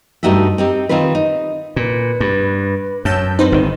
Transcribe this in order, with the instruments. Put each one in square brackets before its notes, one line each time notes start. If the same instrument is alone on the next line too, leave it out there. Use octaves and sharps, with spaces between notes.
[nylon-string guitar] G2 A3 D#4 F#4 G4 E5
C4 D#4 G4
D#3 C4 D#4 F4 B4
D#4
[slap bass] A#2 [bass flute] B4
[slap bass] G2
[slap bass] F#2 [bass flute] C#5 [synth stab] A5 E6 G6
[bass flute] C4 [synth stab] D#4 B4 C5
[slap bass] G1 D#3